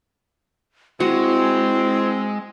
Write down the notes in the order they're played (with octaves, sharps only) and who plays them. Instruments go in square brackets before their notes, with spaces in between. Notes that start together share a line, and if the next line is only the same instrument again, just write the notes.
[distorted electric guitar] G#3 [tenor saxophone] C4 [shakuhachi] E4 [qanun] F#4